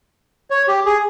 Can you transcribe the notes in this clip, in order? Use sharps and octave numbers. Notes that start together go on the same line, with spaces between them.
C#5
G4
G#4